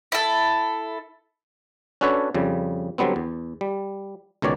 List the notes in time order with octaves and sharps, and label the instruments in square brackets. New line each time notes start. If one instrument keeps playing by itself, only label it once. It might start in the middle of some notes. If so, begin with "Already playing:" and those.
[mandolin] E4 A4
[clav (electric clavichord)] C#4 D4 F#4 A4 B4 C#5
F2 C#3 G3
D3 F#3 G3 B3 C4
E2
G3
C#2 B2 D#3 C#5 D5